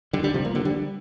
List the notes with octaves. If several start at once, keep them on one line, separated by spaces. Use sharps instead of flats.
D3 G3
D3 G3
C3 F3
F3 A#3
D3 G3
D3 G3